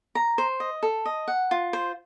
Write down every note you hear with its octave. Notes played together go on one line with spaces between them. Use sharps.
A#5
C5
D#5
A4
D#5
F#5
F4
C5